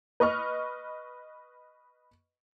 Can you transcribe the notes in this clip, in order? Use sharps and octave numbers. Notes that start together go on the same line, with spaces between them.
B4 D#5 C#6 F6